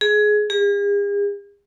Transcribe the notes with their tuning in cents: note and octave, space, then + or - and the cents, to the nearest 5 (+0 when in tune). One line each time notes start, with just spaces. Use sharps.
G#4 +20
G#4 -45